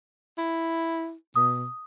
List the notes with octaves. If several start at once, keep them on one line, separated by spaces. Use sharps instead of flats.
E4
B2 D#6